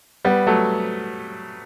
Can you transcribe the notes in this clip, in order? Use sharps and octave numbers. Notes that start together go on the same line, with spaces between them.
G3 B3
F#3 A3